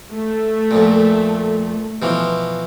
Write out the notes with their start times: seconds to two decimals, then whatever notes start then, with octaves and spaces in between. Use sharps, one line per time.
0.11 A3
0.71 F2 A#2
2.02 B2 E3 F3